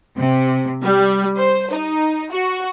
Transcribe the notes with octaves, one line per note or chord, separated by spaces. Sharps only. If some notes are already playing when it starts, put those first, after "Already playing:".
C3
G3
C5
D#4
F#4